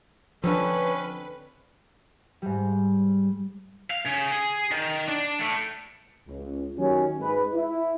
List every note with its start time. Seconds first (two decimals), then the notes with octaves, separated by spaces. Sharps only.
0.44 D3 F3 C4 C#4 B4
2.42 G#2 G3
3.90 F5
4.05 C#3
4.31 G#4
4.72 D#3
5.09 D4
5.40 A2
6.28 C#2
6.78 D#2 F#3 C#4
7.20 G#2 G#3 B4
7.54 E4